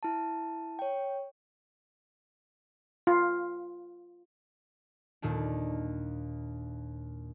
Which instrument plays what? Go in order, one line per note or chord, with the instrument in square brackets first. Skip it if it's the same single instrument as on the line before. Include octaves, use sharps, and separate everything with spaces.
[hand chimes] E4 A5
C#5 G5
[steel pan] F4
[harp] D#2 A#2 D#3 D4